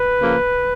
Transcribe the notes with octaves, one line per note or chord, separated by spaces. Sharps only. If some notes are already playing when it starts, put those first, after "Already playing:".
Already playing: B4
C#3 F3 A#3